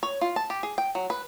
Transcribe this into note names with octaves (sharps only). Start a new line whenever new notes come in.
C#5
F4
A5
G4
G#4
G5
F#3
B4